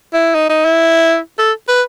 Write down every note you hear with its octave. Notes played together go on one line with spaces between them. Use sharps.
E4
D#4
D#4
E4
A4
B4